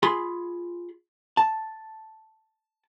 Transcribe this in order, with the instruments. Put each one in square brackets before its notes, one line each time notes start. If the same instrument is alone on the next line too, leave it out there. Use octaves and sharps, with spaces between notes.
[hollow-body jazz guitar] F4 G#4 B5 C6
A5